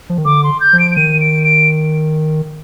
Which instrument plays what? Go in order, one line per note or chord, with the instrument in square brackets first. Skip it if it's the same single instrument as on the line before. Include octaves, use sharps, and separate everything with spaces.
[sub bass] F3
D#3
[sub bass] D3 [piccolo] D6
[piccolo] C6
G6
[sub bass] F3
[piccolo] D7
D7
[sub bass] D#3 [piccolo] D#7
[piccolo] D7
D7